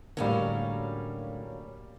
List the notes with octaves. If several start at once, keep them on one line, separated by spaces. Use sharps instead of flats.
A2 D3 F#3 G3 A#3 C#4 F5